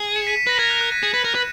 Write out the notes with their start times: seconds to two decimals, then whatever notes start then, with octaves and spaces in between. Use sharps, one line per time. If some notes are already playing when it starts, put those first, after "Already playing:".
Already playing: G#4
0.16 C#7 E7
0.27 B6 D#7
0.37 B6
0.47 B4 A#6
0.59 A#4 G#6
0.70 F#6
0.81 F#6
0.92 B6 D#7
1.02 G#4 C#7 E7
1.14 B4
1.24 A#4
1.35 B4